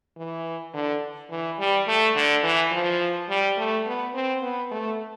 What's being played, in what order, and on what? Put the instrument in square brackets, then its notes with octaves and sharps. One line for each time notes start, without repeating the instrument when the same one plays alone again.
[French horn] E3
D3
E3
G3
A3
D3
E3
F3
G3
A3
B3
C4
B3
A3